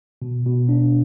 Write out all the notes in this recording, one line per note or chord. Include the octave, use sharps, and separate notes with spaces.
B2
B2
D4